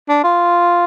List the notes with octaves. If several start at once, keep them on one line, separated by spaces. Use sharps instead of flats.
D4
F4